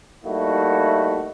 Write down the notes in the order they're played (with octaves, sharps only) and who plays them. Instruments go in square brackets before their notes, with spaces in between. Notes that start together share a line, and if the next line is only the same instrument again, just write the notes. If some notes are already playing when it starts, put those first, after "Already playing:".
[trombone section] G3 A3 A#3 D#4 E4 F#4